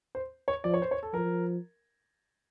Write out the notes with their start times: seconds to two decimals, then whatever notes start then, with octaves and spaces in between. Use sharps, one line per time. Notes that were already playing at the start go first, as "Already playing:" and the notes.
0.15 C5
0.48 C#5
0.64 F3 D5
0.74 C#5
0.82 C5
0.91 C#5
1.03 A4
1.13 F3 A#4